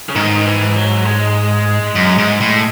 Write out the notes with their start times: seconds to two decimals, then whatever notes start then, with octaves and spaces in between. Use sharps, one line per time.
0.09 C#3
0.15 G#2 D#3
0.46 E3
0.76 F#3
1.05 G#3
1.95 F#2
2.18 G#2
2.40 A2